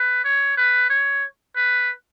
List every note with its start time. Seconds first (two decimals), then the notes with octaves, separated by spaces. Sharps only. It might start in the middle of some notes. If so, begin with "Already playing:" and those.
Already playing: B4
0.25 C#5
0.57 B4
0.90 C#5
1.56 B4